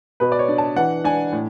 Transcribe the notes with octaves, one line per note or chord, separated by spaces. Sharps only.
B2 B4
D5
C#5
D4
A5
E3 F#5
D4 G#5
A2